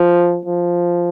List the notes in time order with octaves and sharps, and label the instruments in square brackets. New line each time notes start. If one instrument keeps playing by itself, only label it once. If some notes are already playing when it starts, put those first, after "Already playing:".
Already playing: [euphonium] F3
F3